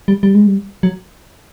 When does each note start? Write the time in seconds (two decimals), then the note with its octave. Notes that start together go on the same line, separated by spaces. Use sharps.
0.08 G3
0.23 G3
0.34 G#3
0.47 G3
0.83 F#3